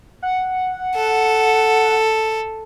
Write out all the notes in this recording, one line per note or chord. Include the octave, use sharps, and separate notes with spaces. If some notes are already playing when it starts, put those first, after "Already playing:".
F#5
A4